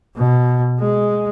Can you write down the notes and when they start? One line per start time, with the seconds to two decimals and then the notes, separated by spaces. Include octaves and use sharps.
0.16 B2
0.80 G#3